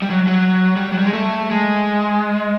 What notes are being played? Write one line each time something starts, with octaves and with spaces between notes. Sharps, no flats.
G3
F#3
F#3
G3
F#3
G3
G#3
A3
G#3